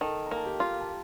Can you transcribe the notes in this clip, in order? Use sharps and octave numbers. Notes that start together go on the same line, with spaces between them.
D#3 A4 A5
A#5
A#3
A5
G4 G5
F4
A5